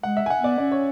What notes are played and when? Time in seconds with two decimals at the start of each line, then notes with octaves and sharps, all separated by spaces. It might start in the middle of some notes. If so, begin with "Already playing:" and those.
0.03 G#3 F#5
0.17 E5
0.26 G#5
0.30 F#5
0.40 B3 D5
0.58 C#4 D5
0.72 C#5